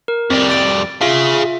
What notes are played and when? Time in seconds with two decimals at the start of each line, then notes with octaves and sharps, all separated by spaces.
0.08 A#4
0.30 F2 G3 C4
0.50 A6 D7
1.01 F4 G#4 E5 F5